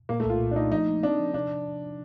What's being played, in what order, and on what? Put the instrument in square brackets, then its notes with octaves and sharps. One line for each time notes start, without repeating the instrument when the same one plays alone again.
[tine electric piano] A#2 [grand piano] A#3
[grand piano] A3
[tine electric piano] C2 [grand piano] F4
[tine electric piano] A#2
[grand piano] D4
[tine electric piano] A3 [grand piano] D#4
[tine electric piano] F3 [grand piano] D#4
[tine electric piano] A#3
[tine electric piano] C4 [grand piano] D4
[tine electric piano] F3
[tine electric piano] C3 [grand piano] D4